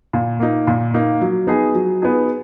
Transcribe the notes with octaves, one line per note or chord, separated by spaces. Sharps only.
A#2
A#3 D#4
A#2
A#3 D#4
F#3
B3 D#4 G#4
F#3
B3 D#4 G#4